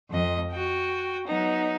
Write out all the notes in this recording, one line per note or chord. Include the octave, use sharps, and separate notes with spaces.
F2 D#5
F#4 G5
F#3 B3 D#4